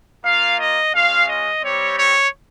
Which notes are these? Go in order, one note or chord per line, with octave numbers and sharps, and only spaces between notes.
A#3 F4 F5
D#5
G#3 C#4 F4 F5
D#5
G3 C4 G4 C#5
C#5